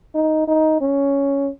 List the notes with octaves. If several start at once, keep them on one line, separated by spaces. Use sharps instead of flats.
D#4
D#4
C#4